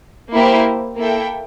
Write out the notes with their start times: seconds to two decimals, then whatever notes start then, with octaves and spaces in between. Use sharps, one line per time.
0.32 A#3 E4 G4 C5 E5
0.97 A#3 E4 A4 E5 G5